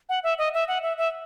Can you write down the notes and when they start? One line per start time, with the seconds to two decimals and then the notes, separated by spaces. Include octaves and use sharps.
0.09 F#5
0.23 E5
0.38 D#5
0.54 E5
0.68 F#5
0.83 E5
0.98 E5